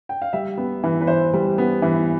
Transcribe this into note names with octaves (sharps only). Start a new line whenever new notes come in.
G5
F5
G3 E5
B3
E3
B4
E3 C5
G3
B3
E3